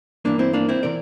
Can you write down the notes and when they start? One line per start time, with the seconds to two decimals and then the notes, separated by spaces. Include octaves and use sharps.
0.25 G2 E3 A#3 D4
0.39 C4 E4
0.53 A#3 D4
0.69 C4 E4
0.83 C3 E3 A#4 D5